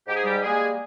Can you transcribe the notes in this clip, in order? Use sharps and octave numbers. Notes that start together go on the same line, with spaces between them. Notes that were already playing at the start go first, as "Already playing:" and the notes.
G#2 G4
G#4
G3 G4
G3 G#3 A#3 G#4